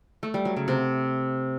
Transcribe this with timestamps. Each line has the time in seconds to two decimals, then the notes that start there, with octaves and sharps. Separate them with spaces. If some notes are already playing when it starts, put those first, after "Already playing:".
0.23 A3
0.34 G3
0.45 F#3
0.57 C#3
0.68 C3